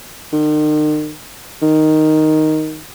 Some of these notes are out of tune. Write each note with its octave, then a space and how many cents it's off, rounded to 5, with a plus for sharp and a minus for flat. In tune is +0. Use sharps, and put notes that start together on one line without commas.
D#3 -40
D#3 +0